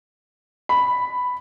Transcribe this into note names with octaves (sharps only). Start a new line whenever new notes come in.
B5